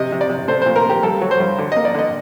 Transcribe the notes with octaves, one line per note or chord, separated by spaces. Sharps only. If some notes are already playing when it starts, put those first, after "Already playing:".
Already playing: C3 D#5
C3
D5
C3
A3 C5
A#2 C5
A#4
A3 G4
G2 A4
F#3
C5
G2
D3
D#5
A#3
D5
D3 D#5